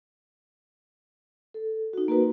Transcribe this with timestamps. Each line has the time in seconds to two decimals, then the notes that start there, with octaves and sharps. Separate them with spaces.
1.54 A4
1.93 D#4 F#4
2.08 A#3 F#4 A#4 B4